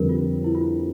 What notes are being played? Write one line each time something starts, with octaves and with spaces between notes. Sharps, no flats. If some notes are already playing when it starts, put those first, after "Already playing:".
Already playing: F2 D3 G3 C4 A#4 B4
F4
E4
F4